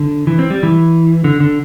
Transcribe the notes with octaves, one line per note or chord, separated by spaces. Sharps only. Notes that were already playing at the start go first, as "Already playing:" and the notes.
Already playing: D3
E3
C4
G3
E3
D3
D3